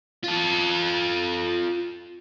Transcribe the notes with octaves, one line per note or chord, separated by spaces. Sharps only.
F4 A4